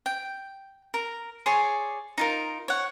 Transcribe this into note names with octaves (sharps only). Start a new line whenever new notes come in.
G5
A#4
G#4 C#5 D5 C6
D#4 F4 A#4
C#5 F#5